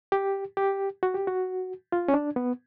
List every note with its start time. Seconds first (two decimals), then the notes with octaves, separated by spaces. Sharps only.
0.12 G4
0.57 G4
1.03 F#4
1.14 G4
1.27 F#4
1.92 F4
2.08 C#4
2.14 D4
2.36 B3